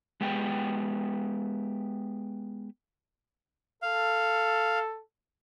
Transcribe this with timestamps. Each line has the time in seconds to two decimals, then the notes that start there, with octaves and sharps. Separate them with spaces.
0.21 G#3 B3 G4 G5
3.82 A4 F5